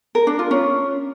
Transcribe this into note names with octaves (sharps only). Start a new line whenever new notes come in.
A#4
D4
F4
C#4